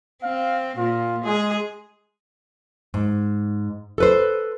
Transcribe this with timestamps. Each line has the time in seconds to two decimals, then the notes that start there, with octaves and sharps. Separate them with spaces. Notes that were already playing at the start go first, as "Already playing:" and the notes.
0.23 C4 F5
0.77 A#2 F4
1.26 G#3 G#4
2.94 G#2
3.98 A4 B4 C5